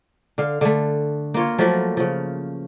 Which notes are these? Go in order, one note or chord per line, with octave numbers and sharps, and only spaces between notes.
D3 F5
D3 A3
A#3 F4 C#5
F3 F#3 A3 A#3
C#3 F3